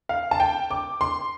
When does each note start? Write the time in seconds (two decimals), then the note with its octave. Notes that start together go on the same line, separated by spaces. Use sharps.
0.09 F5
0.31 A5
0.40 G5
0.71 D6
1.01 C6